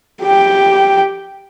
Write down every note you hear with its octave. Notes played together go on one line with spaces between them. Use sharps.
G4 G5